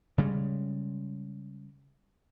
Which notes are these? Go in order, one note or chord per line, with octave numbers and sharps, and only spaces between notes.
C#3 G3 G#3